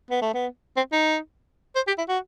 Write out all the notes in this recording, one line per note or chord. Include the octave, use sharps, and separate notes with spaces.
B3
A3
B3
C4
D#4
C5
G4
E4
F#4